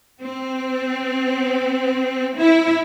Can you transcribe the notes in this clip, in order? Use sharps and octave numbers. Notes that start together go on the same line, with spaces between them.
C4
E4